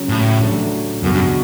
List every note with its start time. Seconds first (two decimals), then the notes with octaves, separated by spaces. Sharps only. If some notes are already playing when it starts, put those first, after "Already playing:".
Already playing: C#3 F#3 C#4
0.09 A2
0.40 A2 F#3 A3 D4 G4
1.03 C#2 F#2 B2 G3 D4 F#4
1.14 F#2